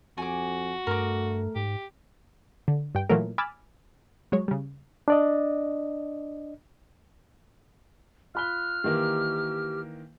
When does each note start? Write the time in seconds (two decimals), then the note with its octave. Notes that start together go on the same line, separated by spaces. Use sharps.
0.18 F2 F#4 G#5 D6
0.87 G2 A3 A#4 D6
1.55 G#2 G4
2.68 D3
2.95 G2 G5
3.09 A#2 E3 F#3 A3 A#4
3.38 G#5 B5 D6 E6 F6 A6
4.32 F#3 G#3 C#5
4.48 C#3 G3
5.08 D4 D5 D#5
8.35 F4 B5 F6 F#6 G7
8.84 D#3 E3 A#3 G4